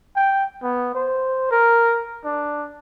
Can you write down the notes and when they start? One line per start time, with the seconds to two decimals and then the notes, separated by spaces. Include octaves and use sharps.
0.16 G5
0.63 B3
0.95 C5
1.51 A#4
2.25 D4